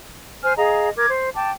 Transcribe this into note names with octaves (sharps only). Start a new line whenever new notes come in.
C5 G#5 F6
G#4 D#5 F5 A#5
A#4 D6 G#6
C5
G5 A5 D6